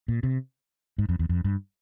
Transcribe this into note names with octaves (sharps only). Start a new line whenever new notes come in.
A#2
C3
G#2
F2
E2
F2
G2